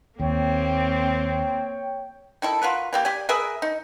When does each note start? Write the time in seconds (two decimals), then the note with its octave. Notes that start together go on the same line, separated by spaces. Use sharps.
0.20 D#2 A#3 C4 C#5 G5
2.42 D#3 E4 A4
2.62 F4 F#4 A#4 B4
2.93 E3 A#3 G4
3.05 G4 D5 G#5
3.29 G#4 A#4 B4 E5
3.62 D#4